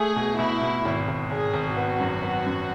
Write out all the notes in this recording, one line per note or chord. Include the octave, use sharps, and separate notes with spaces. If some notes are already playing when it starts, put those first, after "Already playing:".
Already playing: A3 G#4
B2
B2 E4
B2
G#1
G#1
G#1 G#4
G#1
B3 F#4
F#2
B3
F#2